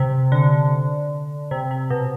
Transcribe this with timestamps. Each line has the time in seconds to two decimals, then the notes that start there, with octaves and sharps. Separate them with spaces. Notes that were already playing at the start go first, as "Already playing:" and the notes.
Already playing: C3
0.32 D3
1.51 C3
1.71 C3
1.90 B2